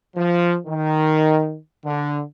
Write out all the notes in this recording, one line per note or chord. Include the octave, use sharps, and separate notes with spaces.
F3
D#3
D3